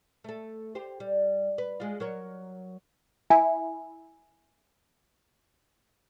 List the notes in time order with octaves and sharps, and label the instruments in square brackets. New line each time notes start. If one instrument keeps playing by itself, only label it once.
[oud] A3 A4
G4 C5
G3
B4
G#3 F4
F#3 A#4 C#5
[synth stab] E4 [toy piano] G#5